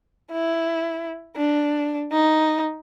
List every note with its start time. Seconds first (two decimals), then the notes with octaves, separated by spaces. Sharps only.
0.32 E4
1.36 D4
2.12 D#4